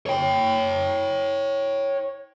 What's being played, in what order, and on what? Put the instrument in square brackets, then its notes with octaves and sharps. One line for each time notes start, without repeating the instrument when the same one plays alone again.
[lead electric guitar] C#5 G5